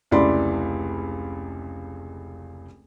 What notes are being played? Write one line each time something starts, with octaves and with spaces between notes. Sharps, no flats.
F1 C#2 E4 D5 B5 C6